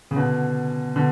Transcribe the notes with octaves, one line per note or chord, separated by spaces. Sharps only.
C#3
B2 D3
B2 D3